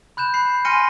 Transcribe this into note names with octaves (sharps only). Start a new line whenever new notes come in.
B5 F#6 G6 E7
B5 C7
G#5 C6 F6 A#6 C#7 D#7